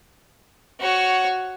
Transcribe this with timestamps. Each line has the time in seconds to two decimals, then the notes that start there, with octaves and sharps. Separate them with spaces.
0.80 F#4 C#5